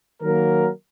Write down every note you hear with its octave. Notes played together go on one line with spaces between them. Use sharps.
D#3 F#3 A#3 A#4